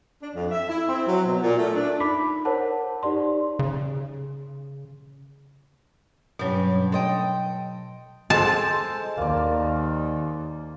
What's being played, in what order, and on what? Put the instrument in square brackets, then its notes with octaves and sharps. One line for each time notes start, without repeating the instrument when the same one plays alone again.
[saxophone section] D4
F2
E5
E4
C4
F#3
B2
A#2
A3
D4
[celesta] D#4 B5 D6 B6
A#4 C5 C#5 F#5 A5
D#4 G4 D5 C6
[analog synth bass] C#3
[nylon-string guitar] G2 C#4 [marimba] B2 F#3
[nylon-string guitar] A4 D#5 G5 [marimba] C6
[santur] G#3 A4 C5 [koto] A5
[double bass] D#2 [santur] A#3 D5